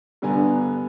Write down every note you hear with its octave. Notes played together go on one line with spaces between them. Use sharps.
G2 D3 B3 G#5 A#5